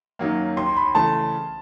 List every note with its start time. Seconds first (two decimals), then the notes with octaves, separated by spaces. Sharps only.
0.19 F#2 D#3 F#3 A#3
0.57 D#2 C6
0.77 B5
0.95 C#3 E3 A3 A5